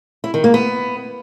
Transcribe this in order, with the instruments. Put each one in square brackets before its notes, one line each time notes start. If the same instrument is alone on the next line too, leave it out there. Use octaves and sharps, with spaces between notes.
[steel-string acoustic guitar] E4
D#3
A#3
B3